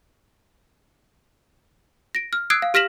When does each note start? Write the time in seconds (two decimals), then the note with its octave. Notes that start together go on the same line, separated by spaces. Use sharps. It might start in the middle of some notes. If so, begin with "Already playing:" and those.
2.15 A#6 D7
2.33 F6
2.50 D#6 E6 F#6 G#6 C7 D7
2.62 F5
2.74 G4 F6 A#6 B6 E7 F#7